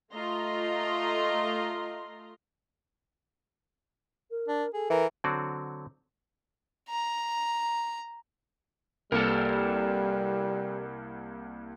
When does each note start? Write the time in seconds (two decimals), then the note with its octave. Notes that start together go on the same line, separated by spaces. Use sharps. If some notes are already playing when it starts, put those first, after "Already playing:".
0.13 A3 F4 D#5 A#5 C6
4.30 A#4
4.48 D4
4.74 G#4 A4
4.90 E3 A#4
5.24 D3 F#3 C4 F#4 D5
6.90 A#5
9.12 C2 G3 A#3 A4 A#4 C#7